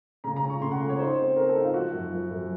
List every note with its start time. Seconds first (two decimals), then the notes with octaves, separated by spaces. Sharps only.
0.24 C#3 A#5
0.36 A#5
0.43 C#4
0.49 C#6
0.61 C#3 C6
0.71 F#5
0.80 A3
0.90 C#5
0.99 D#4 C5
1.18 C4
1.36 C4 A#4
1.49 A4
1.55 D#4
1.62 F4
1.74 F3 F#4
1.93 F#2
2.11 F3
2.31 F#2